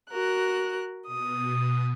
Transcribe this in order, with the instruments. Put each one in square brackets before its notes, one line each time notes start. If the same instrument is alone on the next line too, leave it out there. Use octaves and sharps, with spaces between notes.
[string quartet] F#4 A#4 F#6
[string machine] B2 [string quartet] D#6